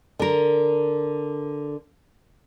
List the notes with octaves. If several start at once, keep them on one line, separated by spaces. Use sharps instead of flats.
D3 A#4